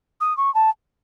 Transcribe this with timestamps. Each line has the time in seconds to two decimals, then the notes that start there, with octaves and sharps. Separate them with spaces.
0.21 D#6
0.37 C#6
0.55 A5